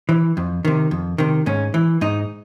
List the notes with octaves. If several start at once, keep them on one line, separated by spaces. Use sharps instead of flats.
E3
F2
C3 D#3
F2
C3 D#3
G#2 C#4
E3
G#2 D#4